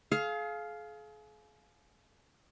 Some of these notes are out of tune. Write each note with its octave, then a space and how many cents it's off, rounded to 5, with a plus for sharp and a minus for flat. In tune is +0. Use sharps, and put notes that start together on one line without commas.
G#4 +40 F5 +0